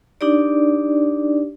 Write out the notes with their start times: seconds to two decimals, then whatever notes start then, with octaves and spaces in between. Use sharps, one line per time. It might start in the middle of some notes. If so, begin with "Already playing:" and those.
0.21 D4 D#4 G4 D5